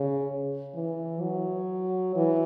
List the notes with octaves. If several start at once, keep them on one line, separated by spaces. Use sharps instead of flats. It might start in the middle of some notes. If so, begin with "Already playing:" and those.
Already playing: C#3
E3
F#3
E3